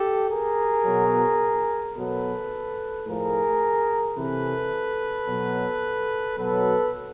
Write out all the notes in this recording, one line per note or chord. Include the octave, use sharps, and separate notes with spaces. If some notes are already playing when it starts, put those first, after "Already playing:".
Already playing: G4 A4
G#4 A#4
B2 F#3
B2 F#3 A4 B4
A2 F3 G#4 A#4
C3 E3 A4 B4
B2 F#3
B2 F#3 A4 B4